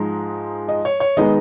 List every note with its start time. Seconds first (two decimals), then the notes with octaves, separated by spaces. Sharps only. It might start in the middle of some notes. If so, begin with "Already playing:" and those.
Already playing: G#2 F3 G#3 D#4
0.68 D#5
0.85 C#5
1.00 C#5
1.17 D#3 G#3 B3 D#4 D#5